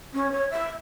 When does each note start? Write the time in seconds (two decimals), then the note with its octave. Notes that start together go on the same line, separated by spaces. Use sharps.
0.14 C#4
0.32 C#5
0.51 E5